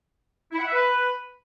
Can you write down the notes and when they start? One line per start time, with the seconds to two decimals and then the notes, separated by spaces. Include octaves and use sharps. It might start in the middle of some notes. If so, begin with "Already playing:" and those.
0.52 E4
0.59 F#5
0.66 E5
0.72 B4